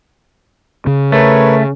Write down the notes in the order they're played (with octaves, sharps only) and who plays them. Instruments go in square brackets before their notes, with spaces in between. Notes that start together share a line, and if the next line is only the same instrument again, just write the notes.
[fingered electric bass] C#3
[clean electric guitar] A3 [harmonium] A#4 B4 C#5